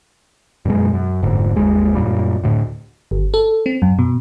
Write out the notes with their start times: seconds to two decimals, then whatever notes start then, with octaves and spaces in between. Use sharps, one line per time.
0.65 F#2 B2 G#3
0.93 F#2
1.23 F1 G#2 D3
1.56 G1 D#2 G#3
1.95 F#2 A#2 G3
2.43 D2 A2
3.11 G1
3.34 A4
3.66 C4
3.82 F#2
3.99 B2